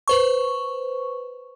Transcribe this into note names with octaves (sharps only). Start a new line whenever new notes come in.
B4 C5 C#6